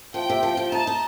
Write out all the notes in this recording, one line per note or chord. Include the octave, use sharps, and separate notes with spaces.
F3 G5
C3
F3
F3
D#4 A5
D#4